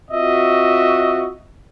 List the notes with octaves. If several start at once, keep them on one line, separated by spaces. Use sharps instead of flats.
C4 F4 F#4 D#5 E5